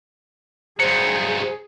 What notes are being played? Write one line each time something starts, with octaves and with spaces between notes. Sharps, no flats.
G2 F#3 G#4 C5 C#7